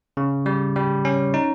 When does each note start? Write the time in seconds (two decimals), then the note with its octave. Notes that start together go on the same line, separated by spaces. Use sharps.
0.17 C#3
0.46 G3
0.76 G3
1.05 C#4
1.34 D#4